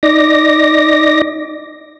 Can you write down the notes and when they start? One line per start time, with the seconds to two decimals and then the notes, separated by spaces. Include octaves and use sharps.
0.03 D#4 D5 A#6